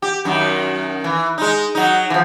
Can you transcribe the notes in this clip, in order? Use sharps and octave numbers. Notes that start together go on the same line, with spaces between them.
G4
F#2 D#3
E3
G#3 D#4
F#3 D#4
E3 F3